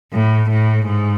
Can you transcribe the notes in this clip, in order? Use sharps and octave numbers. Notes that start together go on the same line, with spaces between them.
A2
A2
G#2